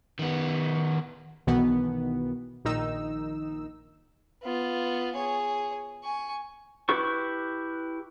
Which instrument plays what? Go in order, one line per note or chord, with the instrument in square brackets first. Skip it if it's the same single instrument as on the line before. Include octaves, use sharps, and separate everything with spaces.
[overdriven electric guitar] D#3 B3
[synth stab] B1 B2 D#3 E3 B3
A#1 D#3 D#4 E6
[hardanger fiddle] B3 F4
G#4 C#5
G#5 C#6
[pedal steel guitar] E4 G4 B4 C#6